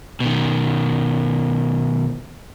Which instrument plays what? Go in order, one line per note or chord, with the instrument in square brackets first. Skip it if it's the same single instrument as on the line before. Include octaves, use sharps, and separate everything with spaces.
[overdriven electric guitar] B2 D#3